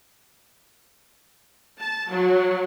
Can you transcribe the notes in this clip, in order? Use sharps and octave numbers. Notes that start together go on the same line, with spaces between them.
A5
F#3